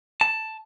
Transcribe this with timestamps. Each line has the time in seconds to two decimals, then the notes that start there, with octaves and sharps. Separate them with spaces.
0.21 A5